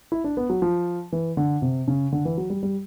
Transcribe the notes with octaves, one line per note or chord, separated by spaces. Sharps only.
E4
D4
B3
F#3
F3
E3
D3
C3
C#3
D3
E3
F#3
G3
G3